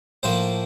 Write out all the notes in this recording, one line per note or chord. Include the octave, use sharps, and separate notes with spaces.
A2 F3 A#3 C5